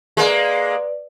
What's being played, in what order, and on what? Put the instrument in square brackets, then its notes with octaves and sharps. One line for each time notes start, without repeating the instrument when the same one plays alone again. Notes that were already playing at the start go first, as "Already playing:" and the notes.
[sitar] G#3 A#3 [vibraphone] B4 D5